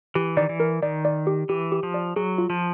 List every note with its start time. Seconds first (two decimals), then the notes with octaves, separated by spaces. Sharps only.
0.15 E3 G4
0.37 D#3 D5
0.49 E3
0.60 A#4
0.83 D#3 D5
1.05 D5
1.27 G4
1.49 E3 G4
1.72 G4
1.83 F3
1.94 D5
2.16 F#3 G#4
2.38 F4
2.50 F3